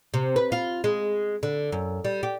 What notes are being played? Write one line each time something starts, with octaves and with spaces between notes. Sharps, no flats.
C3
B4
F4
G#3
D3
F#2
G3
G4